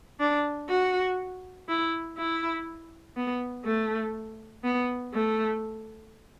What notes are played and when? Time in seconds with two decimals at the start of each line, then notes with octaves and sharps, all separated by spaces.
0.20 D4
0.69 F#4
1.68 E4
2.18 E4
3.16 B3
3.65 A3
4.64 B3
5.14 A3